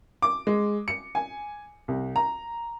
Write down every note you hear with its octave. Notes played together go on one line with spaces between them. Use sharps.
D6
G#3
C#7
G#5
C2
A#5